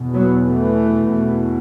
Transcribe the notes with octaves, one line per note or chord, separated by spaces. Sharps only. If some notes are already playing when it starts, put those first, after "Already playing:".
Already playing: E2 B2
F#3 B3
E3 A3
E2 B2